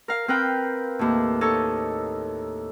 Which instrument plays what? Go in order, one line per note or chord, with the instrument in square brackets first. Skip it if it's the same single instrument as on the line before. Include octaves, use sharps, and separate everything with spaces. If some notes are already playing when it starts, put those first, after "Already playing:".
[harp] A#4 F5
C4 A#4 B4 G5
D#2 A2
D#4 A4 C#5